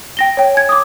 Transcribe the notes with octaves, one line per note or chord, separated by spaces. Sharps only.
G5 A#6 G7
C#5 G5
G#5 G#6
D6 D#6